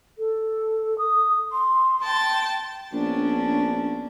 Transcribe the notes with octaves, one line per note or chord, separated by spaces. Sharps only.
A4
D#6
C6
G5 A5
A#1 B3 C#4 D4